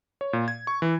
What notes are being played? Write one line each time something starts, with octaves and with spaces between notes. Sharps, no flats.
C#5
A#2
G#6
C#6
E3